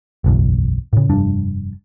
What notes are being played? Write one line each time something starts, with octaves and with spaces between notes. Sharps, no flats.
F#1 B1 E2
A2 C#3
F1 G2 D4